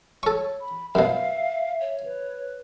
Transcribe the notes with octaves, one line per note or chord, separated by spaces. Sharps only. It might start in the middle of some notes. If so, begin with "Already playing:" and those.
A4 C#5 C#6
B5
F#2 B2 E5 F5
C#5
B4